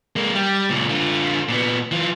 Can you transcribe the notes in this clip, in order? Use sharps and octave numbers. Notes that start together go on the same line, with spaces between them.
G#3 A#3
G3
C#2 A#2
D3 F4
A#2 B3
E3 F4